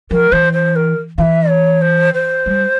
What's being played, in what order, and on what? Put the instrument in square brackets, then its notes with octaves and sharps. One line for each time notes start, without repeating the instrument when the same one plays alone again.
[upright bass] F3 [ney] A#4
[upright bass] E3 [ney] C5
[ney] C5
A#4
[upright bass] E3 [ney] E5 F5
[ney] C#5
C5
C5
[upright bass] G3